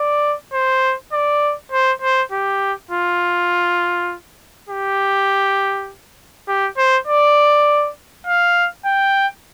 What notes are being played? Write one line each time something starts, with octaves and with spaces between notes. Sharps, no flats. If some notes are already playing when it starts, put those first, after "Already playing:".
Already playing: D5
C5
D5
C5
C5
G4
F4
G4
G4
C5
D5
F5
G5